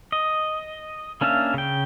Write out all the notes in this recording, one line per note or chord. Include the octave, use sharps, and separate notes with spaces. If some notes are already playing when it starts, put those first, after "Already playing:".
D#5
A#3 C#4 D4 E5 F5
C#3 G5